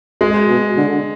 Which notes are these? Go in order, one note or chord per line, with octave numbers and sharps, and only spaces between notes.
G#3
B2
D3